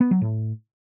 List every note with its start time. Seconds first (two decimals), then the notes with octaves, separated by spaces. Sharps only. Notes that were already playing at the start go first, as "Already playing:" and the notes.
0.01 B3
0.11 F#3
0.21 A2